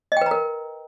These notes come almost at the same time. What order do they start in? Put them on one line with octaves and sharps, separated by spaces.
D#5 G5 B4 A#5 A#4